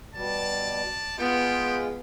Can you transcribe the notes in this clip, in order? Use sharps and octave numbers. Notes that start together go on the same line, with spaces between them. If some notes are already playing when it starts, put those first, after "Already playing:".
B2 G3 D5 A5
G#3 B3 F4 G#4 B4 G5